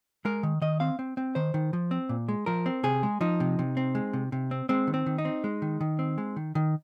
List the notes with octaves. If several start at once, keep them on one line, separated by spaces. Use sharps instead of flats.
G#3 A#4
D#3
D#3 D#5
C4 F5
C4
C4
D#3 C5
D#3
F3
C4
A#2
G#3
F3 A#4
C4
C3 G#4
G#3
F3 D#4
C3
C3
C4
G#3
C3
C3
C4
G#3 C4
D#3
C4
D#3
D#4
C4
G#3
D#3
D#3
C4
G#3
D#3
D#3